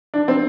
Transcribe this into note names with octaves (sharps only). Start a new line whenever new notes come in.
D4
C4